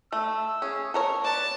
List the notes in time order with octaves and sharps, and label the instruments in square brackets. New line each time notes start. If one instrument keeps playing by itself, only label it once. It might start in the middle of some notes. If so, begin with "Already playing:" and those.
[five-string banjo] A3 [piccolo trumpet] E6
[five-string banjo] C#4 [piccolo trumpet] G#4
[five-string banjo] A4 A#4 C#5 [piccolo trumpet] C#6
[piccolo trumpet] B4 [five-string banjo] D5 [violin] A5